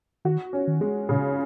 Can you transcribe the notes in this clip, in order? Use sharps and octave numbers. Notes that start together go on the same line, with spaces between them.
D#3 F#4
C#4
D#3
G#3
A#2 C#3